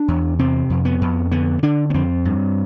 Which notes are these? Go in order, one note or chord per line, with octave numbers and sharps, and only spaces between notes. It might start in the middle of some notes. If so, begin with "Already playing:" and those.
Already playing: D4
E2
C3 C4
F2
B3
F2
D3 B3
D3 D4
B3
F2 C4
G2